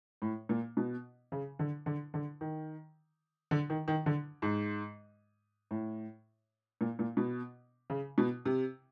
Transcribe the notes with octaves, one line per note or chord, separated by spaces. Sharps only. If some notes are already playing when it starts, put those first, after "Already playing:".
A2
A#2
B2
C#3
D3
D3
D3
D#3
D3
D#3
D#3
D3
G#2
A2
A#2
A#2
B2
C#3
B2
C3